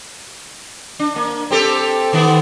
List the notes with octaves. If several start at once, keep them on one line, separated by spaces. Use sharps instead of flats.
D4
A#3
C4 G4 A4
D#3 B3